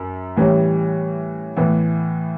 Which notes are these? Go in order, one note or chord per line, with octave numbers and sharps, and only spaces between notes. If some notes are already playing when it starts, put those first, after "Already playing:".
Already playing: F#2
A2 E3 G3 C#4
A2 E3 B3